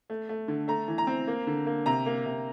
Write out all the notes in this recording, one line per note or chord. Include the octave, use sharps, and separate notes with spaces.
A3
A3
D3
A3 A#5
E3
A#5
C4
A#3
D3
A#3
C3 A#5
A#3
C3